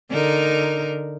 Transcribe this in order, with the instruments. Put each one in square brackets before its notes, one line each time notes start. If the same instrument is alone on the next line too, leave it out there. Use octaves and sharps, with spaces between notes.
[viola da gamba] D3 D#4 A#4